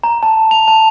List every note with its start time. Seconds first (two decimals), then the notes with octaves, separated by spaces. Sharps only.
0.04 A#5
0.23 A5
0.51 F7
0.68 A5